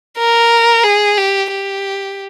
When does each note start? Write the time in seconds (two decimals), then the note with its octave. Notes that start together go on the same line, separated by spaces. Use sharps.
0.18 A#4
0.84 G#4
1.18 G4
1.50 G4